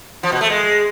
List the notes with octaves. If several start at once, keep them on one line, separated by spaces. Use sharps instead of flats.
F3
B2
A3
G#3